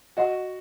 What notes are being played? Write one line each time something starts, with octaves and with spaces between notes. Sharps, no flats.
F#4 D#5 F#5 C#6